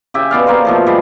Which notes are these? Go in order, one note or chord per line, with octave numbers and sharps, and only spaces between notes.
C#3 G4 E5 G#5
B2 B3 D5 F5
A#3 C4 A#4 C5
B2 F3 A3
G3 G#3